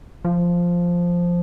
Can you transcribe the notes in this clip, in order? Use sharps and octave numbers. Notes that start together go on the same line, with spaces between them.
F3